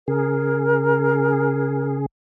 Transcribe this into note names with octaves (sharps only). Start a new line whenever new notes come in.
C#3 G#4 A#4